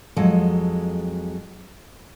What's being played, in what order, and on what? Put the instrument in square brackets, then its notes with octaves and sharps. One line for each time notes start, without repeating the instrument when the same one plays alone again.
[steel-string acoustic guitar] F2 F#3 G#3 A4